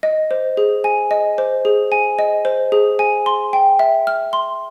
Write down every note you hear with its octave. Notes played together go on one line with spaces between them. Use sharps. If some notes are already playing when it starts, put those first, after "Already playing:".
D#5
C5
G#4
G#5
D#5
C5
G#4
G#5
D#5
C5
G#4
G#5
C6
G5
E5
F6
C6